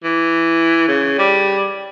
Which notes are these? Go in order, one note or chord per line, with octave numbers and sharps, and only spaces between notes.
E3
C#3
G3